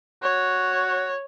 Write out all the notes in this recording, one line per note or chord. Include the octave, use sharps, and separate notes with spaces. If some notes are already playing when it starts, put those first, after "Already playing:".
F#4 C#5